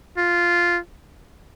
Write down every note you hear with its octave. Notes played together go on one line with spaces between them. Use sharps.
F4